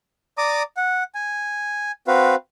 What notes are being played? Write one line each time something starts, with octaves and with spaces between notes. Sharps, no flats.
D5 A#5 D6 D#6
F#5
G#5
C4 F#4 B4 F5